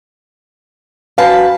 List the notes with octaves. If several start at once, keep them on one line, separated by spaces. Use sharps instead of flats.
F#2 B4 F5 A5